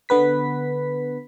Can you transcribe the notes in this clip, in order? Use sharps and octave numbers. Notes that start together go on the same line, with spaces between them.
D3 B3 B4 B6